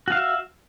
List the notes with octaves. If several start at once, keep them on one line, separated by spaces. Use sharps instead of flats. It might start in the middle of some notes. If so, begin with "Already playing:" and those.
F#4 E5 F5